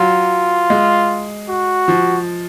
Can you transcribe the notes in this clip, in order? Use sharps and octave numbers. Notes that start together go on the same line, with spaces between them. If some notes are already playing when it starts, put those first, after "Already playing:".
Already playing: F#3 F4
G#3
F#4
F3